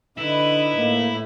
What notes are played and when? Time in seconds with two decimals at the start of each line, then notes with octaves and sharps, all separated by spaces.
0.18 D3 D#4 E4 B4 D#5
0.78 A2 A#3